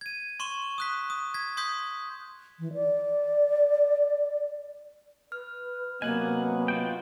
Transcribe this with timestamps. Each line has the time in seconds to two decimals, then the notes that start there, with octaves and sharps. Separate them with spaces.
0.01 G#6 D#7
0.40 C6 C#6 E7 G7
0.78 D#6 F#6 B6
1.10 D#6
1.34 G#6 B6
1.57 C6 D#6 G6 B6
2.60 E3
2.74 D5
5.32 B4 F6
6.02 C3 F#3 A#3 B3 D#5 F#5 G#5
6.68 F4 F#4 G5